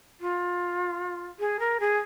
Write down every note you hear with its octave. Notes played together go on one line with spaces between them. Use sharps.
F4
G#4
A#4
G#4